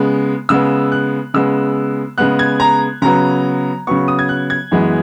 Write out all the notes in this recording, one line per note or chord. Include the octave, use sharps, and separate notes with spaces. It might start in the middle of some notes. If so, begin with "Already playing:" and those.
Already playing: C#3 G#3 B3
C#3 G#3 B3 E6
F#6
C#3 G#3 B3 E6
C#3 G#3 B3 F#6
G#6
A#5
C#3 F#3 B3 A#5
C#3 F#3 B3 C#6
D#6
G#6
F#6
G#6
F#2 E3 G#3 B3